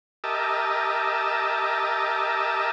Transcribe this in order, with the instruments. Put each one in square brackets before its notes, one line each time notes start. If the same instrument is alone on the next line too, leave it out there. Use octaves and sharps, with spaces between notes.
[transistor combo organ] G4 A#4 D#5 E5 A5